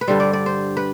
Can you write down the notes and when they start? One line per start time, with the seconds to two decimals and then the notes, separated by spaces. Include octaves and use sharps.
0.01 B4
0.08 G2 D3 G3 C5
0.20 D5
0.33 D5
0.46 C5
0.77 B4